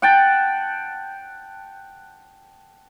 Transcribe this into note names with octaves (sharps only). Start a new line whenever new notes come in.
F#5 G5 A5